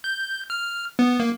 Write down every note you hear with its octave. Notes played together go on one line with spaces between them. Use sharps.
G6
F6
B3
A#3